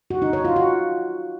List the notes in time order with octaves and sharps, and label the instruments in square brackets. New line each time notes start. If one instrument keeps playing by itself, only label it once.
[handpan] F#4
D#4
C#5
F4
F#4